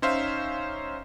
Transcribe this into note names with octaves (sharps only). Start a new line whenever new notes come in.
C#4 D#4 C5 E5 F5